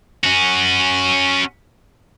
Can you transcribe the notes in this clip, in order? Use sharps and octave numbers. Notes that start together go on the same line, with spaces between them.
C#4 F#4